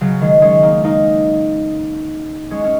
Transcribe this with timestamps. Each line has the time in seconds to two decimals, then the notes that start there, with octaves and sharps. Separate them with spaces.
0.01 C#3 F#3
0.21 D#3 G#3
0.42 G#3 C#4
0.63 A#3 D#4
0.84 A#3 D#4
2.51 G#3 C#4
2.64 C#4